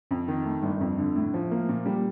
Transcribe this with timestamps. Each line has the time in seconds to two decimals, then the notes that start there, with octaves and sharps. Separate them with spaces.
0.11 F2
0.28 D#3
0.45 A3
0.63 G1
0.81 F2
0.99 D3
1.16 A2
1.34 F3
1.51 A#3
1.69 A#2
1.86 G3